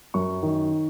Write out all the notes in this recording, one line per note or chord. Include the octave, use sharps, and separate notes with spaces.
F#2 C#6
D#3